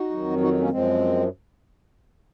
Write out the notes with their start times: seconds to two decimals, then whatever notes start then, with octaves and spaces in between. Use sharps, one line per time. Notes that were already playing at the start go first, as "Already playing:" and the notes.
Already playing: D#4 F#4
0.11 F2 D#3 F#3
0.41 D#4 F#4
0.60 A#3 C#4
0.70 F#2 F3 G#3 C4